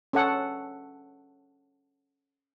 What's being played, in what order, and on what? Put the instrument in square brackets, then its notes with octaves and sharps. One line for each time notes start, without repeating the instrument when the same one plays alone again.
[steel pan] C#4 A4 F#5